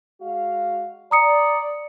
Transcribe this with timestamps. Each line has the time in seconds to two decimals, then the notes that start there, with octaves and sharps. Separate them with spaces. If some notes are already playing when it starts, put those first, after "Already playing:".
0.20 G#3 F#4 F5
1.11 D5 A#5 D#6 C#7